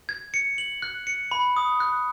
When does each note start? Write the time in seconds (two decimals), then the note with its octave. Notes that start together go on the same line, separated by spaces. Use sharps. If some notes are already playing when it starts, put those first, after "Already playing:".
0.09 G#6
0.34 C#7
0.58 F#7
0.82 F#6
1.07 C#7
1.31 B5
1.57 D#6
1.80 F#6